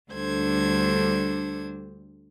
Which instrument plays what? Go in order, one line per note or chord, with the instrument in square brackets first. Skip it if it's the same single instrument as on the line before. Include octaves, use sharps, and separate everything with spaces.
[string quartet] D2 G3 D4 A4 C5 G#6